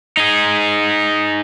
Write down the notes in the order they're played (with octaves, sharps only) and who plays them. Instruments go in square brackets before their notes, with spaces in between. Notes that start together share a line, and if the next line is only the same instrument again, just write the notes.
[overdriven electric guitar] D#4 G#4